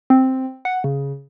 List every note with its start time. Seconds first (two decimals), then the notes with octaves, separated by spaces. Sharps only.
0.10 C4
0.65 F#5
0.84 C#3